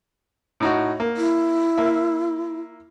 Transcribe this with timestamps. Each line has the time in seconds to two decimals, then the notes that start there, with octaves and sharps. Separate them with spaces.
0.60 A2 D#4 F#4
1.00 A#3
1.17 E4
1.78 A#3 E5